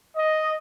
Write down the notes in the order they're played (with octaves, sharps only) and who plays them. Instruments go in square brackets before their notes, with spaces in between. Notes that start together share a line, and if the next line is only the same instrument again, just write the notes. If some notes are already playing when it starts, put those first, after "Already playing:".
[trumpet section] D#5